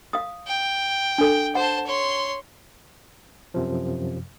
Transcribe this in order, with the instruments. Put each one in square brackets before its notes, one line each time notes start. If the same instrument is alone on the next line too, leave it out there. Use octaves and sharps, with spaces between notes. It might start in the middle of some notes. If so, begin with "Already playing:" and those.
[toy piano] F5 D#6
[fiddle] G5
[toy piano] D4 A4
[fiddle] C5 A5 [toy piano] F#5
[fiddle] C#5 C6
[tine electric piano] F#2 C3 F3